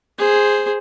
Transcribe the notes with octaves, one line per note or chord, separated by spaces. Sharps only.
G#4 C5